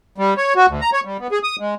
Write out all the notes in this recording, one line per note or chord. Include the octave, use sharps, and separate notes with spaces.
G3
C#5
F#4
D2
A#5
C#5
G3
B3
G#4
D#6
G#3